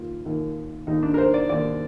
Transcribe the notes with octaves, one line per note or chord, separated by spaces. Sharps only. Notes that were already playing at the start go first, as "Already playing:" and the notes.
Already playing: D#2 A#3 F4
D#2 D#3 A#3
D#2 D#3 A#3 D#4
D4
A#4
C5
D5
D#2 D#3 A#3 D5